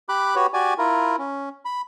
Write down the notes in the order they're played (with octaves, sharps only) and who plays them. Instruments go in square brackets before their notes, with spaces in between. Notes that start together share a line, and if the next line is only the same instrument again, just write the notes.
[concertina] G4 B5 D6 F#6
F#4 G4 B4 C#5
F#4 G4 D5 G#5
E4 F4 A#4
C#4
B5